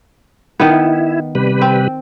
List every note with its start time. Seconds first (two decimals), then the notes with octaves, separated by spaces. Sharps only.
0.60 D#3 B3 E4
1.35 C3 G3 B4
1.62 C4